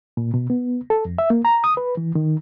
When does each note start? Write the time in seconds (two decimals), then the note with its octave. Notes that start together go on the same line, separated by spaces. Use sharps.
0.17 A#2
0.34 B2
0.50 B3
0.90 A4
1.05 F2
1.18 E5
1.30 A#3
1.45 A#5
1.64 D#6
1.77 B4
1.97 E3
2.15 D#3